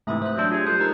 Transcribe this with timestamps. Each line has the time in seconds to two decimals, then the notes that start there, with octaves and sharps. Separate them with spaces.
0.07 G#2 C3 E3 A3 E5 D#6
0.22 C5 F#6
0.37 F#3 C4 D4
0.51 F4 G4 G#4
0.67 G3 A4 C5 D#6 F#6
0.80 D#4 A#4 A#5